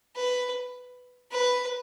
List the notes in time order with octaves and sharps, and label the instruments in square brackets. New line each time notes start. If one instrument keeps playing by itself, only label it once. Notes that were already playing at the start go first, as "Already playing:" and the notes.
[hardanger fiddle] B4
B4